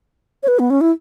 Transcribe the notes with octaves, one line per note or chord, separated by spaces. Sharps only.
C#5
B4
B3
C#4
E4